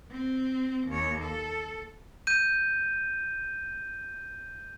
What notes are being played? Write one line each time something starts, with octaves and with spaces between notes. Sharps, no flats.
C4
D#2 C#5
A4
G6 D#7